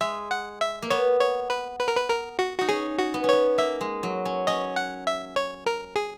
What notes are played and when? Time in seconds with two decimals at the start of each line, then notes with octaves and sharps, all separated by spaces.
0.01 G#3 E5
0.31 F#5
0.61 E5
0.82 A#3
0.90 B3 C#5
1.21 C#5
1.50 B4
1.79 B4
1.88 A#4
1.96 B4
2.10 A#4
2.39 F#4
2.58 D#4 F#4
2.69 C#4 G#4
2.98 F#4
3.14 B3
3.24 C#4
3.29 B3 C#5
3.58 A#3 E5
3.81 G#3
4.03 F#3
4.25 C#4
4.47 C#4 D#5
4.76 F#5
5.07 E5
5.36 C#5
5.66 A#4
5.96 G#4